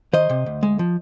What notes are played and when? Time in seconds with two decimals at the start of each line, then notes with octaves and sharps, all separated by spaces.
0.13 D#3 C5 D#5
0.30 C3
0.46 D2
0.63 G#3
0.79 F3